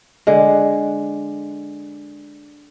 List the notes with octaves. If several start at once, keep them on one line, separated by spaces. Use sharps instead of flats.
D3 G#3